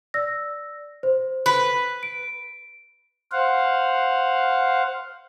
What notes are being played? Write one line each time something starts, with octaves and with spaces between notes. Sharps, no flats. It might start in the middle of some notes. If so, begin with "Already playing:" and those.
D5 E6 A#6
C5
B4
D7
C5 F5 F#5